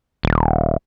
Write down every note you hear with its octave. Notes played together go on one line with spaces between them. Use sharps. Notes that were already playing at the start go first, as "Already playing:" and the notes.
D#1